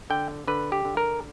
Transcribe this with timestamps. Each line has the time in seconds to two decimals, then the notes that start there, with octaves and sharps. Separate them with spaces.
0.10 D3 G5
0.47 D3 B4
0.72 G4
0.85 D3
0.97 A#4